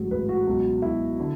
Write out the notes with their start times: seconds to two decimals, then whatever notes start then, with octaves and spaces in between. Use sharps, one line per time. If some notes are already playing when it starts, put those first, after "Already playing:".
Already playing: A1 G#2 F#3
0.11 A1 G#2 F#3 B4
0.29 F#4
0.47 C#2 B2 F#3
0.82 C#2 B2 F#3 E4
1.20 D3